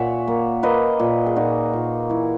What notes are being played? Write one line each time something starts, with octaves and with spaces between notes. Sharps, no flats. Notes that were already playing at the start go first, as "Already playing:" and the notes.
Already playing: A#2 A#3 C#5 E5 F#5 G#5
A#3
A#3 B4 D#5
A#2
G#4
A#2 D#4 F#4
A#2
E3 E4